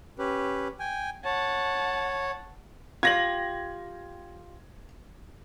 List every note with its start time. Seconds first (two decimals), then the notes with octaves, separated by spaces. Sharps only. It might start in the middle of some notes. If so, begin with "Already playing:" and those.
0.19 C#4 G4 B4
0.79 G5 G#5
1.25 C#5 F#5 A5
3.03 F4 G4 G#6 A#6 F#7